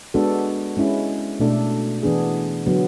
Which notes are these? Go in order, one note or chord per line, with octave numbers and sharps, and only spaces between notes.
G#3 B3 D4 F#4 A4
G#3 C#4 E4
B2 A3 D4 A4
E3 B3 D4 G#4
D3 F#3 B3